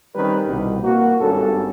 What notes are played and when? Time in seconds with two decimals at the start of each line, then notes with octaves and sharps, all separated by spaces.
0.15 D#3 G3 C4 C#4 A#4 B4
0.46 C2 B2
0.82 A#3 F#4
1.20 G#1 G2 C#4 A4